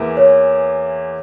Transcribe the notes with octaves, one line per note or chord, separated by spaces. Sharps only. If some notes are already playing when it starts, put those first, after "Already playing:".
Already playing: E2 E3 A#3 E4
C#5